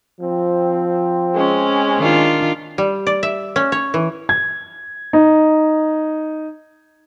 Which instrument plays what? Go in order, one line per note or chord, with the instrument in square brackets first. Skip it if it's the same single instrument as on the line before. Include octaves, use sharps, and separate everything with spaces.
[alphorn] F3 [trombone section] C4
[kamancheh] G#3 C#4
[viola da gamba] D#3 D4 F4
[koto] G3
D5
E5
C#4
C#5
E3
[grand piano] G#6
D#4